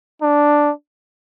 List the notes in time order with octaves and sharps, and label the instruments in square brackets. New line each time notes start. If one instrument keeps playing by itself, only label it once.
[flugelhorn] D4